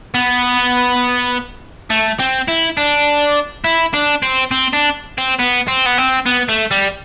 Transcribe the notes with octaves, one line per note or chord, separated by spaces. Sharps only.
B3
A3
C4
E4
D4
E4
D4
C4
C4
D4
C4
B3
C4
B3
C4
B3
A3
G3